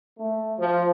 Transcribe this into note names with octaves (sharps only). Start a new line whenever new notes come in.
A3
F3